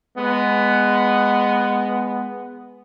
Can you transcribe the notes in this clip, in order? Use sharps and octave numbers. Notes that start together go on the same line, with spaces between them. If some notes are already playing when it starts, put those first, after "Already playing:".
G#3 B3